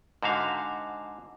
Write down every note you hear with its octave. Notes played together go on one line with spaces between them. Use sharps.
G#2 D3 F#4 E5 F5